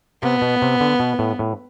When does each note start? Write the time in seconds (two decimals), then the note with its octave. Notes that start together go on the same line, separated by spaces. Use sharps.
0.23 C3 B3
0.42 B2
0.62 C3
0.80 D3
1.00 B2
1.19 A2
1.39 A2